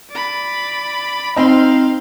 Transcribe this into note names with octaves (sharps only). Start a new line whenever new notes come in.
D5 B5
C4 D#4 F5 C6